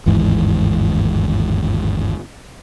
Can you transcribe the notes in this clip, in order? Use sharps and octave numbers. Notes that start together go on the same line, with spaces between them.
G1 D#2 G#2 E3